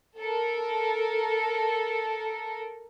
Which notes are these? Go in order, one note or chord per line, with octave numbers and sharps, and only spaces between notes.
A4 A#4